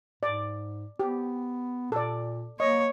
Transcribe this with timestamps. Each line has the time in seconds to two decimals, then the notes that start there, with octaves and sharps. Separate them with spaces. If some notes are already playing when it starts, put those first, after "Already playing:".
0.23 G#2 D5
0.99 B3 G4
1.92 A#2 A4 D5
2.60 A#3 C#5 D#5